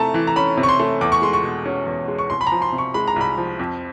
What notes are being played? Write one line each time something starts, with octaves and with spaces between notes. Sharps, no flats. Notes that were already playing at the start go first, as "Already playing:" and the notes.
Already playing: C3 A3 A5 A#5
E3
A#5
C#4 B5
C3
C#6
C6
A3
E2 D6
C#6
G#3 C6
C#6
B2
C#4
E2
G#3
C#6
C2 C6
B5
F3 A#5
C6
C3
C#6
G#3 B5
A#5
C2 B5
F3
F2